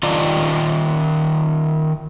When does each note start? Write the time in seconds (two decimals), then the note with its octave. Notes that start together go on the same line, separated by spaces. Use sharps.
0.03 D#3 F4 D5 D#5 A5 A#5